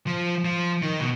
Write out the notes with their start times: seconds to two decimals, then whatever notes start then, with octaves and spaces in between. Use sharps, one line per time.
0.07 F3
0.45 F3
0.82 D#3
1.00 B2